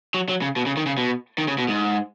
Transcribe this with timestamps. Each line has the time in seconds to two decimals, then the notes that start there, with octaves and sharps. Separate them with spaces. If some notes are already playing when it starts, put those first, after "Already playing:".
0.14 F#3
0.29 F#3
0.42 C#3
0.56 B2
0.66 C#3
0.77 D#3
0.86 C#3
0.97 B2
1.38 D#3
1.48 C#3
1.58 B2
1.68 G#2